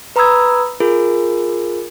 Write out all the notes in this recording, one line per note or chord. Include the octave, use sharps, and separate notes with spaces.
B4 A#5 B5 D#6 E6 G#6
F4 G#4 A#4